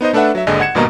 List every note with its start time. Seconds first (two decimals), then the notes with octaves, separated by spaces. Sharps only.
0.01 B3 D#4 C5 D#5
0.13 A3 D4 A4 B4 E5 F#5
0.35 F#3 E5
0.47 G#1 D#2 D3 G#4 D#5
0.60 F#5 G#6 C#7 E7
0.75 G#1 G2 B2 A#3 D#5 A#5